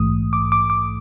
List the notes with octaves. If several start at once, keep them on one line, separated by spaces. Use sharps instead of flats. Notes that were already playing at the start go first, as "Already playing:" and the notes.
Already playing: A#1 G#2 E3 A3 D#6
D6
D6
D6